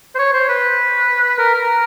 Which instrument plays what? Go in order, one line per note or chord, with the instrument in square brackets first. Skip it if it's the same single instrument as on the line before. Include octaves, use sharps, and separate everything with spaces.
[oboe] C5
C#5
C5
B4
A#4
A#4